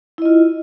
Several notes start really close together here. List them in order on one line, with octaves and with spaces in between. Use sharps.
E4 D#5 F4